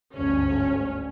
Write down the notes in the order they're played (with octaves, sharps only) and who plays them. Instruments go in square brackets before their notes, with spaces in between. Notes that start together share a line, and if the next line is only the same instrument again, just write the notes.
[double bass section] G1 D2 G#2 [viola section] C#4